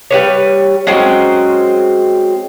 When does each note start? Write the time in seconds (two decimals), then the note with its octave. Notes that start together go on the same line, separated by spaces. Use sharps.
0.11 G3 B4 C#5
0.87 F#3 G#3 C4 C#4